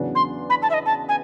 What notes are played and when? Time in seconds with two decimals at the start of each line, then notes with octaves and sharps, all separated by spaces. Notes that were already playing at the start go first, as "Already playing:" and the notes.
Already playing: E2 C#3 F#3 B3 D4
0.15 C6
0.49 B5
0.62 A5
0.70 E5
0.74 D#5
0.86 A5
1.08 G#5